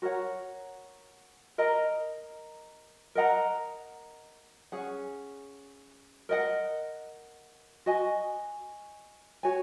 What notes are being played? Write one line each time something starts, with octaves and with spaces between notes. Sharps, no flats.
F#4 A#4 C#5 F#5
A#4 D#5 A#5
A#4 D#5 F#5 A#5
C#4 G#4 F#5
A#4 D#5 F#5
F#4 D#5 G#5
F#4 C#5 G#5